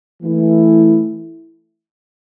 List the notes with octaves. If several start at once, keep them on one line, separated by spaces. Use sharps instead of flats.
E3 A3 E4